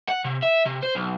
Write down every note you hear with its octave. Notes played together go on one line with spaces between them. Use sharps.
F#5
C3
E5
C3
C5
B1